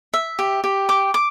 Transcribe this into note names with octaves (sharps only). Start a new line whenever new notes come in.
E5
G4
G4
D6
D6